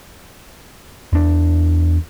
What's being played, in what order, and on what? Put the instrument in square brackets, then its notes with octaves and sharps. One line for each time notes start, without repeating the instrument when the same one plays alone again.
[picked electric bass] E2 D4